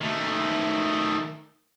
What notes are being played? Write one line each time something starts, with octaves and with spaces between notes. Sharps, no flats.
D#3 A3